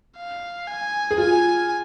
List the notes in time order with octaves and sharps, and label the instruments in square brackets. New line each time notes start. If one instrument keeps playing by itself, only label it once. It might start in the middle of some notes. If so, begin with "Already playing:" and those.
[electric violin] F5
G#5
[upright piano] G#4
[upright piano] F4 [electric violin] G#5